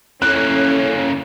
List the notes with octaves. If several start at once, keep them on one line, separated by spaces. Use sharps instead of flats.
C#3 A#3 C#4 E4 A4 C#5 F#6